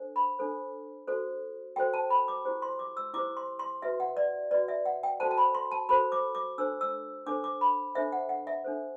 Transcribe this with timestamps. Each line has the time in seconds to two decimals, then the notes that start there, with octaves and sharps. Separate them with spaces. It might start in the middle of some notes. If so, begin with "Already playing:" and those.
Already playing: D4 A4 C5
0.16 B5
0.39 D4 A4 C5
1.07 F#4 A4 C5
1.76 F#4 A4 C5 G5
1.94 A5
2.10 B5
2.28 D6
2.45 E4 G4 C5
2.62 C6
2.79 D6
2.97 E6
3.14 E4 G4 C5 D6
3.37 C6
3.59 C6
3.82 F#4 B4 E5
4.00 F#5
4.17 D5
4.51 F#4 B4 D5
4.68 E5
4.86 F#5
5.03 G5
5.20 F#4 A4 C5 A5
5.31 A5
5.38 B5
5.55 C6
5.72 A5
5.89 F#4 A4 C5 B5
6.12 D6
6.35 D6
6.58 D4 A4 C5 E6
6.81 E6
7.26 D4 A4 C5 D6
7.44 D6
7.61 B5
7.95 D4 A4 C5 E5
8.12 F#5
8.29 F#5
8.47 E5
8.64 D4 A4 C5